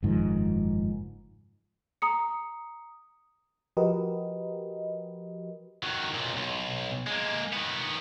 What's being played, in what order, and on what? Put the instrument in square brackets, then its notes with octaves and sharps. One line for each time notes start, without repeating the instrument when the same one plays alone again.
[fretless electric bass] F#1 G#2 D#3 F3
[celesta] A#5 D#6 C#7
[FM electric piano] F3 F#4 G4 A#4 B4 D#5
[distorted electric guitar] D#3 F#3
B1 A#2
B1
G#3 A#3
D#3 B3